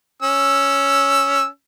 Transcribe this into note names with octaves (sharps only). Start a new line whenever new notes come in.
C#4 E6